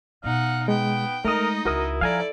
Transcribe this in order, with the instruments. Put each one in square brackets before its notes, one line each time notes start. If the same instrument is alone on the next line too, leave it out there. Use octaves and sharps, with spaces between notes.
[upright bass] B2 [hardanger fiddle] D#4 F#5 [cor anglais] F5
[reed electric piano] G#3 [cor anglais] B3 [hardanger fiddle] G5
[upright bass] G#3 [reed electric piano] A3 D#6 [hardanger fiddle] D#4 D#5 [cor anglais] A#4
[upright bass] C#2 [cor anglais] E4 [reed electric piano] F#4 A#4 D#6
[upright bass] F3 [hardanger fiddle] A4 D5 [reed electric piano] F5 G#5 A#5